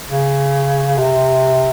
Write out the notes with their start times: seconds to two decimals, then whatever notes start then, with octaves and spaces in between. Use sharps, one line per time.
0.08 C#3
0.98 C3